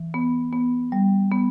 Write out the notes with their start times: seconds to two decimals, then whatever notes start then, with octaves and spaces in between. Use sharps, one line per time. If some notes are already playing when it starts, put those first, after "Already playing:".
Already playing: E3
0.14 B3
0.53 B3
0.92 G3
1.31 B3